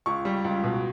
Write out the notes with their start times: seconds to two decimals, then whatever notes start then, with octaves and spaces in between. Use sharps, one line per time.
0.06 C#2 C#6
0.25 G3
0.45 C#2
0.64 B2